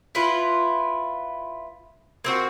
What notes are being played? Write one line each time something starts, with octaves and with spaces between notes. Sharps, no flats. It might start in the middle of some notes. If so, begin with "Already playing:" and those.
E4 F4 B4
A#3 C4 F#4